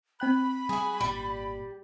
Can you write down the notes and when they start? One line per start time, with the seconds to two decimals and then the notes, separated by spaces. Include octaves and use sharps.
0.20 C4 G5 B5 F#6
0.69 G3 F#4 G#4
1.01 G#1 A#2 G3